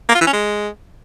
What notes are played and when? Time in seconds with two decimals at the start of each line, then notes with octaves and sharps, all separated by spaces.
0.09 A#3
0.15 F4
0.21 E3
0.27 C#4
0.33 G#3